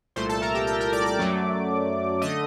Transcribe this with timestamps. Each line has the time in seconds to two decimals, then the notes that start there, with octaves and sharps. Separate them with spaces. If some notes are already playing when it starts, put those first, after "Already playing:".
0.16 C2 A#2 A3 C5 C6
0.29 A4 A5
0.42 A#4 A#5
0.55 G4 G5
0.67 G4 G5
0.80 A#4 A#5
0.93 D5 D6
1.06 D5 D6
1.19 F#2 F#3 A3
2.22 D3 A3 D#5 D#6